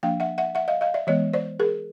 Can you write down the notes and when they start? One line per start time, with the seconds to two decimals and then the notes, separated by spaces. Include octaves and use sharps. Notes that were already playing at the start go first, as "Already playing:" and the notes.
0.03 F3 A#3 D4 F5 G5
0.20 E5 F#5
0.38 E5 F#5
0.55 E5 F#5
0.68 D#5 F5
0.81 D#5 F5
0.94 D5 E5
1.07 E3 G#3 B3 C#5 D#5
1.33 C5 D5
1.60 G#4 A#4